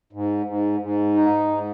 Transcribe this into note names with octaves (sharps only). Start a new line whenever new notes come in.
G#2
G#2
G#2
D#4
G#2